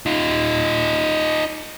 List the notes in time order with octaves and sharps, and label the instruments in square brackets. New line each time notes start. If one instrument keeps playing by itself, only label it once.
[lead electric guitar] D#4 F4